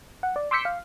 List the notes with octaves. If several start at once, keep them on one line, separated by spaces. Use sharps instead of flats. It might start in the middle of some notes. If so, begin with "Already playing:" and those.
F#5
D5
C6 D6 E6 G6 B6 C#7
F5